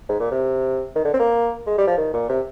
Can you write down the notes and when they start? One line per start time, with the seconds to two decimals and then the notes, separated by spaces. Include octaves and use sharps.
0.09 G#2
0.20 A#2
0.31 C3
0.95 D#3
1.04 D3
1.14 C4
1.19 A#3
1.66 G#3
1.78 G3
1.87 F3
1.98 D#3
2.14 A#2
2.29 C3